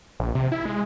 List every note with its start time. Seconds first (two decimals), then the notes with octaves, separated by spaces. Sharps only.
0.20 A#1
0.35 C3
0.52 E4
0.66 G#3